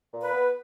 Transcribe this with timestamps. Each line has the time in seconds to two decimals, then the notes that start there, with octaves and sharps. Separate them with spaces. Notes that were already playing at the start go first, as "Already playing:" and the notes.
0.13 A#2
0.22 B4
0.33 B3